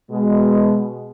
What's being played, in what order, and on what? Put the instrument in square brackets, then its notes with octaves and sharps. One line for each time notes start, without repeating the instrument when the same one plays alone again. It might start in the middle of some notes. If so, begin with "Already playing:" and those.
[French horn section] B2 G#3